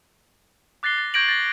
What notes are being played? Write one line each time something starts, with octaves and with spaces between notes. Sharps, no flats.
D6 F#6 A6 A#6 C7 G7
A6
C#6 G6 G#6 A#6 D7 F#7
A6 A#6